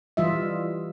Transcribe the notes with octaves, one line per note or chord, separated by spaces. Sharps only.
E3 G3 F4 D#5 E5